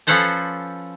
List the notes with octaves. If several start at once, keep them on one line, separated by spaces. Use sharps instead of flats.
F3 C#4 A4 B4 C5 A5